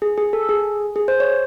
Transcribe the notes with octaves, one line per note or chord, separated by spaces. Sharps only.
G#4
G#4
A4
G#4
G#4
C5
C#5